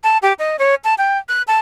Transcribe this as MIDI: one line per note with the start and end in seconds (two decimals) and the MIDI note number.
0.04 0.18 81
0.23 0.33 67
0.39 0.56 75
0.59 0.75 73
0.84 0.95 81
0.98 1.18 79
1.29 1.42 90
1.48 1.60 81